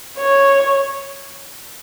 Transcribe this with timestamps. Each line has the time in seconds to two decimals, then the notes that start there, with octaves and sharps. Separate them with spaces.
0.17 C#5